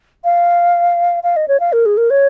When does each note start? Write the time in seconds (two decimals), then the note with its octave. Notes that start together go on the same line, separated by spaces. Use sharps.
0.24 F5
1.23 F5
1.36 D#5
1.48 C#5
1.60 F5
1.73 A#4
1.86 G#4
1.97 A#4
2.10 C#5